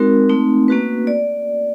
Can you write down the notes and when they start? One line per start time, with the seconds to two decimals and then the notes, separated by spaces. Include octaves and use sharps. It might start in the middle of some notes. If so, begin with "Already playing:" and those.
Already playing: G#3 C4 D#4 F#4 A#4
0.29 A3 C4 D#4
0.68 A#3 C#4 F#4 B4
1.07 D5